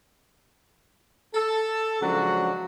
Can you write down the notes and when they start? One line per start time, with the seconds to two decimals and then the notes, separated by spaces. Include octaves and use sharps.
1.34 A4
2.01 C#3 F3 F#3 G#3 D4 F#4